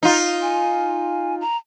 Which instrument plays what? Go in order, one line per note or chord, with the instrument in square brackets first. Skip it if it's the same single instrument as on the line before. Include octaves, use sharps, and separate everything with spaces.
[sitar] D#4 F4
[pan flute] G#5
A#5